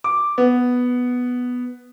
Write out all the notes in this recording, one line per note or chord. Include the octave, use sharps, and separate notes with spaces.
D6
B3